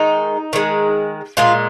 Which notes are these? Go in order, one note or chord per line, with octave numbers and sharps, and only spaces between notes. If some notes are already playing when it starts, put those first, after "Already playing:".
Already playing: D#3 G#3 D#4
D#3 G#3
A#2 G#3 F4